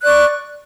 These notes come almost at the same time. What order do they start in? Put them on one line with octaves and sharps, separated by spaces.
F#6 D5 C#6